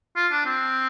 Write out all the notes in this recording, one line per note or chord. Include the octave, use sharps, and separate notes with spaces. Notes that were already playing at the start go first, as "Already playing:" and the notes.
F4
D4
C4